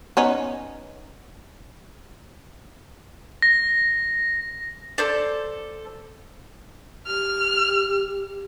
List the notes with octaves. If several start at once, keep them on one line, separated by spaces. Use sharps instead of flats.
B3 C#4 D#4
A#6
A4 C5 D5
G4 F6